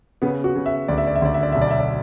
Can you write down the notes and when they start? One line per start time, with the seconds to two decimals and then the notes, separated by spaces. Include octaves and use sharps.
0.22 C#3 B3
0.44 F#4
0.56 C#3
0.66 E5
0.88 D2 D5
0.98 E5
1.07 D5
1.16 E5
1.22 D2 D5
1.34 E5
1.43 D5
1.52 B1 E5
1.61 D5
1.71 E5
1.80 D5